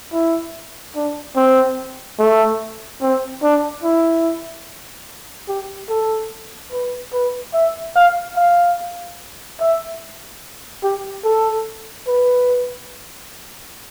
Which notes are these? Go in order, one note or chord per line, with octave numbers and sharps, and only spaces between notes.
E4
D4
C4
A3
C4
D4
E4
G4
A4
B4
B4
E5
F5
F5
E5
G4
A4
B4